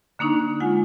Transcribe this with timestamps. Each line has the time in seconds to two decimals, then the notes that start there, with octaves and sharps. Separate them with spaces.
0.19 D3 A#3 D4 D#4 C#6
0.60 G#3 F4 F#5 G#5